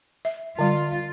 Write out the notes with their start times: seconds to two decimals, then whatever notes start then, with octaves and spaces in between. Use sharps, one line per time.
0.25 E5
0.59 D3 G3 F4